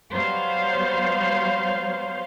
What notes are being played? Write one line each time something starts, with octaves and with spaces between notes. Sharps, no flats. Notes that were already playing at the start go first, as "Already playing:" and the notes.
F#3 G3 B3 C5 C#5 F5